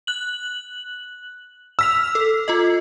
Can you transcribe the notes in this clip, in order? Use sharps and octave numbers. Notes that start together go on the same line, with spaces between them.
F#6 F#7
E6 F6 B6 F7
A4
F4 A4 D#5